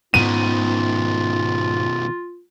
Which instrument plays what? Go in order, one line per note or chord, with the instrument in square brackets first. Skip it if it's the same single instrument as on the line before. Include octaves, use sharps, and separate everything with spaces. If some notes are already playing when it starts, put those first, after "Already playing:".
[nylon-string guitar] G#2 [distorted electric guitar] B2 D#3 [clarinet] F4 [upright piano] D#7